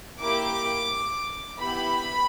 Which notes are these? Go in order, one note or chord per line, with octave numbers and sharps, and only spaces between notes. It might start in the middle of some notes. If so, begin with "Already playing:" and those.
A#3 E4 G4 D6
B3 E4 G4 B5